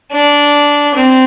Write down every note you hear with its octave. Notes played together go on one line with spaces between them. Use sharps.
D4
C4